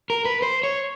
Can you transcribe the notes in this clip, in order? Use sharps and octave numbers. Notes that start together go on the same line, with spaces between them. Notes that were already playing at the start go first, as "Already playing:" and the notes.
A#4
B4
C5
C#5